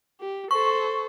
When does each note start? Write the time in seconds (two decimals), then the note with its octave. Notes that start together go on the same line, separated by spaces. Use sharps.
0.21 G4
0.51 A4 C5 C#6